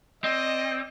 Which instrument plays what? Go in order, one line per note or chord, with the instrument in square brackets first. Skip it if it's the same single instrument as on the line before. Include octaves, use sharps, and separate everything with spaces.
[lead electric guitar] C4 [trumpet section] D5 D#5